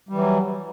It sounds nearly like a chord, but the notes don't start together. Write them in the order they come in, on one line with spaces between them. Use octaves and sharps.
G3 E3 F#3